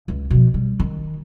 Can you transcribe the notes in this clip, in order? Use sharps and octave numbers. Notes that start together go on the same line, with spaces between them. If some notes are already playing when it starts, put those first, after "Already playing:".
C#2
B2 F3
G3
D#3